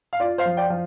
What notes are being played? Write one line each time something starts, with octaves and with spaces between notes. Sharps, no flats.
F5
F4 D5
C5 F5
F3
D5 G5
F3